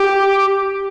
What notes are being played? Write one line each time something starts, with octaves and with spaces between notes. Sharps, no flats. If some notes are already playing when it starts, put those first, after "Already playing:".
Already playing: G4